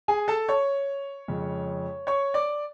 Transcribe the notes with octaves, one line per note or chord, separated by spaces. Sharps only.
G#4 G#5
A4 A5
C#5 C#6
F2 C#3 G#3
C#5 C#6
D5 D6